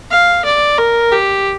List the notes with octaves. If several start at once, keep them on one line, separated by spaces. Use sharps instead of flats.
F5
D5
A#4
G4